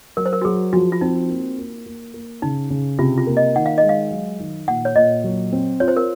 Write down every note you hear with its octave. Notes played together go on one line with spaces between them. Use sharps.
F#3 A#4
C5
A#4
F#4
F#3 G#4
F3 F#4
F4
C4 D#4
A#3
A#3
A#3
A#3
C#3 D#4
C#3
C3 F4
F4
A#3
D#5
D#3 F#5
F5
D#5
G#3
F5
F#3
D#3
A#2 F#5
C#5
A#2 D#5
F#3
C4
F4 C#5
C5
A#4